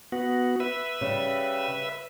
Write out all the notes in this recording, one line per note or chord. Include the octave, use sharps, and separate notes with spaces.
B3 F#4
B4 E5
C#3 G3